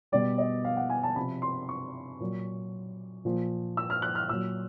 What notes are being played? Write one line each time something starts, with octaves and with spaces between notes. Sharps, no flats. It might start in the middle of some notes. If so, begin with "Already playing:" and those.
B2 G3 D5
D#5
F5
F#5
G#5
A5
C3 F3 B5
C6
C#6
A#2 F#3
A#2 F3
E6
F6
F#6
F6
A#2 F#3 E6